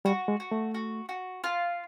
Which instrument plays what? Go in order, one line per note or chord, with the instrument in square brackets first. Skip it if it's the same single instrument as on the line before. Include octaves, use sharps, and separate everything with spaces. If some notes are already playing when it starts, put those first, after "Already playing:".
[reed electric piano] G3 [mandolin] F#4
[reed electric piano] G#3
[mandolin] F#4
[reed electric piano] A3
[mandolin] F#4
F#4
F4